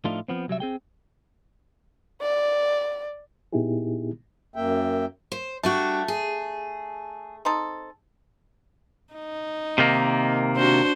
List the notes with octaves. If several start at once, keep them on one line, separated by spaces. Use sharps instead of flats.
A2 F3 A3 D4 D#4 F4
F3 B3 C4
C2 F#3 G3 E5
C4 G#4 G5
D5
A#2 B3 D#4 E4 G4 G#4
F#2 A#3 E5 G5
C5
G3 A3 D4 F#4
G#4
C4 D#4 A4
D#4
C3 D#3 A#3
D4 F#4 C5